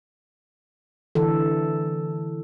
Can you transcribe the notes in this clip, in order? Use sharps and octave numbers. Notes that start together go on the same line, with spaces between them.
D3 E3 A4